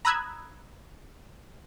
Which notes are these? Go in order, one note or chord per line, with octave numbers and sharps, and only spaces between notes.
A#5 B5 D#6 E6 F#6 G#6